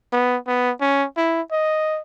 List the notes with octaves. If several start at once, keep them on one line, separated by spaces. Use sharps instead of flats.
B3
B3
C#4
E4
D#5